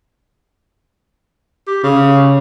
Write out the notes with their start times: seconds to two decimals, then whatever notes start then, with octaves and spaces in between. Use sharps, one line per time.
1.67 G4
1.83 C#3